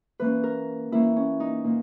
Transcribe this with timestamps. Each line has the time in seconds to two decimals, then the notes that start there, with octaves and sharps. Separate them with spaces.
0.19 E3 A#3 C#4 B4
0.43 A#4
0.92 E3 A#3 C#4 E4
1.16 C#4
1.40 D#4
1.64 A#2 A#3